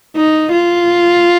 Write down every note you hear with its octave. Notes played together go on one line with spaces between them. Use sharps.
D#4
F4